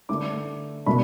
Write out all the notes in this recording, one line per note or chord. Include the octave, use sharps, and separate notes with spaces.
D3 A3 D4 D6
B2 A3 D4 B5